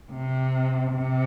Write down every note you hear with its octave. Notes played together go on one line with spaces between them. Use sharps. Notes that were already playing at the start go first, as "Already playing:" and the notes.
C3
C3